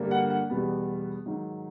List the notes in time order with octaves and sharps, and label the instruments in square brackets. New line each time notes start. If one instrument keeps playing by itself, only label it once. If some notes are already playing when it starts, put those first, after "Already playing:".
Already playing: [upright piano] G2 D3 G3 A#3
F#5
F#5
E2 B2 G3 B3
G#2 D#3 F#3